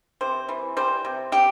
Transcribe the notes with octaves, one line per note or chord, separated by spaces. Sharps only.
C3 C5
E3
G3 C5
C3
C3 G4